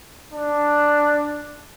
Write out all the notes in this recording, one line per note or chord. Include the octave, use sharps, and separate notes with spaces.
D4